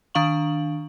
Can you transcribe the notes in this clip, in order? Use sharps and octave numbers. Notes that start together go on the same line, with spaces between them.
D#3 D4 F5 C#6 F#7